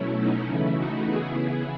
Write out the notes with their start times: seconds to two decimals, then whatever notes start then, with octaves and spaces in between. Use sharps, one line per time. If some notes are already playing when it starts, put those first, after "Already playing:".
Already playing: B2 F#3 A3 C#4 E4
0.17 D#4
0.46 C#3 E3 A3 E4
0.77 D#4 F#4
1.05 C#3 E3 B3 E4 G#4
1.35 E4 G#4